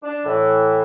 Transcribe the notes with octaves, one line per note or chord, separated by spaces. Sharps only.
D4
A2 E3